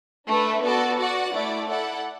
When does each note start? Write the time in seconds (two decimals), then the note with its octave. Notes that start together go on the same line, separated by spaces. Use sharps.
0.27 A3 D4 B4
0.63 B3 F#4 A4 D5 A5
0.98 F#4 D5 F#5
1.33 A3 E4 D5
1.67 E4 A4 D5 F#5